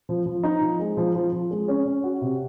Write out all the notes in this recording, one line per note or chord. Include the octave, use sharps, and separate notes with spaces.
F3
F3
D#4
F3
G#3
F3
F3
F3
G#3
C#4
C#4
F#4
C3